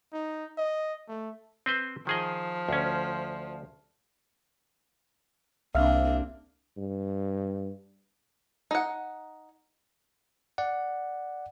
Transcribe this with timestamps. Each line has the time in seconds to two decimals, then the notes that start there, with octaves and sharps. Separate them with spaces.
0.13 D#4
0.58 D#5
1.08 A3
1.66 C4 B4 C5
2.07 D#3 F3 G#4 D#5
2.69 D2 C#4
5.75 C2 A#3 C4 D4 E5 F5 F6
6.77 G2
8.71 D#4 F#5
10.58 D5 F#5